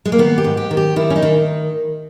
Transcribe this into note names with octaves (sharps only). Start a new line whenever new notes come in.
G#3
A#3
D#3 B3
G4
G#2
G4
D#3
G4
D#3 E4
C#4
D#4
D#3